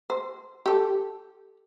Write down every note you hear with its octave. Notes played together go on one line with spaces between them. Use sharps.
C5
G4 A4